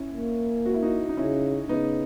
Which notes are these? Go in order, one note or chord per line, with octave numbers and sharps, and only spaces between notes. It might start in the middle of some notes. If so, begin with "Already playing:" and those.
Already playing: C#4 E4
A#3
F#4
E4
D#4 F#4
D#4
C#3 C#4 E4
C#3 B3 D#4